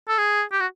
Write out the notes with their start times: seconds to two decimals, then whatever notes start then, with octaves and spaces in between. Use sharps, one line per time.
0.08 A4
0.18 G#4
0.52 G4
0.60 F#4